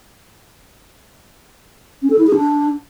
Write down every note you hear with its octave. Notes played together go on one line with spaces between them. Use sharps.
C#4
A4
E4
G#4
D4